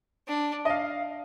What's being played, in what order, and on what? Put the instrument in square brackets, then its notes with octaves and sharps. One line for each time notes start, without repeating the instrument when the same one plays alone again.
[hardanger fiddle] D4
[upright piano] D#5
F5